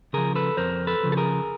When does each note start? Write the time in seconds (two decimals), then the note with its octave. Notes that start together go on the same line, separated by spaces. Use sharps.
0.13 C#3 F3 G#4 A#4
0.35 A4 B4
0.57 F2 A#4 C5
0.87 A4 B4
1.03 C#3 F3
1.12 A4
1.17 G#4 A#4